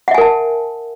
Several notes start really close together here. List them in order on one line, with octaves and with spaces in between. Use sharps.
F#5 E5 G#5 A#4 A5